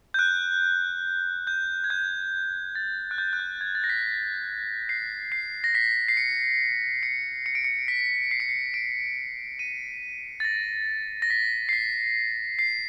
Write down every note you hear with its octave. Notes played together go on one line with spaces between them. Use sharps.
G6
F#6
G6
G#6
G6
A6
F#6
G6
F#6
G6
G#6
A6
A#6
B6
C7
C7
A#6
B6
C7
C#7
C#7
C#7
D7
C#7
B6
C7
C#7
C7
D7
D#7
A6
A#6
A#6
B6
C7
B6
C7